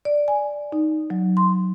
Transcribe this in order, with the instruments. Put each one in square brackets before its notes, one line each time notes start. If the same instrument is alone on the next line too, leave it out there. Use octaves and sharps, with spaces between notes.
[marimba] D5
G#5
D#4
F#3
C6